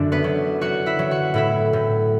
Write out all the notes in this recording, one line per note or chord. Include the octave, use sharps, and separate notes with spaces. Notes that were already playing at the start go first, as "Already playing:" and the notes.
Already playing: F#2 D3 D4 E4 D5 E5
B3 B4
F#3
F#3 F#4 F#5
E4 E5
F#3
F#4 F#5
A2 E4 E5
A2